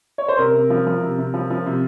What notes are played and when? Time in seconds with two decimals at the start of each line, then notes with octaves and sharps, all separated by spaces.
0.18 C#5
0.28 C5
0.38 C3 A#4
0.54 C3
0.70 F3
0.86 F3
1.02 C3
1.18 C3
1.34 F3
1.50 F3
1.66 C3